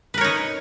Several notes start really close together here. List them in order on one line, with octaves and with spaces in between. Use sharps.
B4 A#4 C#5 D#4